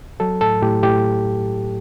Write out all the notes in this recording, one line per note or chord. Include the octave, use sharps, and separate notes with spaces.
F#3 A4
A2 A4
A2 G4
A2 G4